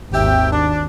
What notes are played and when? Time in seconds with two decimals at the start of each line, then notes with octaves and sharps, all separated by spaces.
0.13 G#1 D#2 G4 E5 G5
0.50 D4